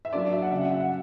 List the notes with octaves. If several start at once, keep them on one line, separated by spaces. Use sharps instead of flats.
E5
F#3 A#3 D4 D5
E5
F#5
C#3 F#3 C#4 E5
F#5
E5
F#5